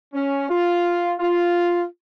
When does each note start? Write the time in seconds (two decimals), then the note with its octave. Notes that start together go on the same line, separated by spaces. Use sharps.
0.14 C#4
0.49 F4
1.20 F4